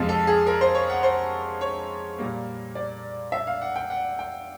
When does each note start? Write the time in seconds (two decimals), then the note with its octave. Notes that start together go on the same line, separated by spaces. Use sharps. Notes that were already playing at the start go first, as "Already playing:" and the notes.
Already playing: F2 C3 F3 G#3
0.09 A4
0.27 G#4
0.47 A#4
0.61 C5
0.75 C#5
0.90 F#5
1.03 C5
1.61 C#5
2.18 A#2 G3 A#3
2.75 D5
3.32 E5
3.47 F5
3.62 F#5
3.76 G5
3.90 F#5
4.19 G5